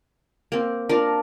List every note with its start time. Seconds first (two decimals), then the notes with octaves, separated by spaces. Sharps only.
0.52 A#3 C4
0.89 D4 F4 A#4